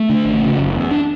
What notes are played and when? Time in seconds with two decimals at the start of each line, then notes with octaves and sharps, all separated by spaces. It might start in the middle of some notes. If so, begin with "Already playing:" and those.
Already playing: A3
0.09 D3
0.25 A1
0.41 C#3
0.58 F#1
0.75 E2
0.91 D4